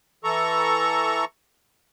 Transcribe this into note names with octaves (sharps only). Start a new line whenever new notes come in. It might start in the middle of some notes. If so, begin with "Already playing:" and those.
E3 A4 A#5 C#6